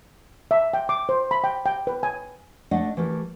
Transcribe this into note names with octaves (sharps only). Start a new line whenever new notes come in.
E5
G5
D6
C5
B5
G5
G5
B4
G#5
A3 D4 A4 D#5 F#5
E3 A3 G4 A#4